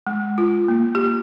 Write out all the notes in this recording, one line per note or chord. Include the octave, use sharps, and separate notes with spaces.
G#3
F4
A#3
G4